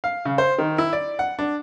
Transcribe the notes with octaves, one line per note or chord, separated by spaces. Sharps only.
F5
C#3
C5
D#3
E4
D5
F#5
D4